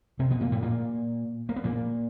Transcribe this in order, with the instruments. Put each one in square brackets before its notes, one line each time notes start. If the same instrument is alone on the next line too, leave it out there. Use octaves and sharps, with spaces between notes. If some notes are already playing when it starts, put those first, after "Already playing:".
[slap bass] C3 C4
B2 B3
A#2 A#3
A2 A3
A#2 A#3
A#3
B3
A#2 A#3